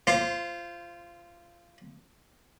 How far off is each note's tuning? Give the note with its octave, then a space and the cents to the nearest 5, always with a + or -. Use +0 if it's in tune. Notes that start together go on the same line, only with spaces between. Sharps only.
F4 -20 C5 +0